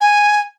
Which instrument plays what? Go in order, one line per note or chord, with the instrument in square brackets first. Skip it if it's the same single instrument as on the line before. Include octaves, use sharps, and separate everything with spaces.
[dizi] G#5